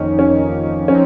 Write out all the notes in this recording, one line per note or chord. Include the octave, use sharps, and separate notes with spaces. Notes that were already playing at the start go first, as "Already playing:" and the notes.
Already playing: F2 D#3 A#3 C#4 D#4
C#4
F3 C4 C#4 D#4